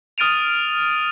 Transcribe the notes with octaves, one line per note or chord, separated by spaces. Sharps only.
D#6 F6 A6 D7 D#7 F7